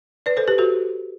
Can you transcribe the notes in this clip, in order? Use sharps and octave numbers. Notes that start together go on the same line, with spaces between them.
B4 D5
A4 C5
G4 B4
F#4 A4